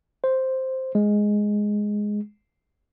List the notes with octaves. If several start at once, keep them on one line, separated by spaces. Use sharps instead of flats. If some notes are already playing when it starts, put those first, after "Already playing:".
C5
G#3